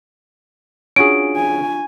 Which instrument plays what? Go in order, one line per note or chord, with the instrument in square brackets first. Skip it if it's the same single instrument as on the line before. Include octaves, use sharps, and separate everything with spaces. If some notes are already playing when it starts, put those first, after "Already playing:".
[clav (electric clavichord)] C#4 F#4 G#4 [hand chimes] D4 F4 C#6 [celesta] D7
[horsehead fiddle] G#5